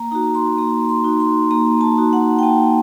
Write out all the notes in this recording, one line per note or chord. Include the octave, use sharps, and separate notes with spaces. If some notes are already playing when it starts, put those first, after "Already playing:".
Already playing: A#3 A#5
D#4 F#4 A#5
C6
A#3 A#5
C6
D#4 F#4
C6
A#3 A#5
A5
D#4 F#4
F#5
G5
A#3 A5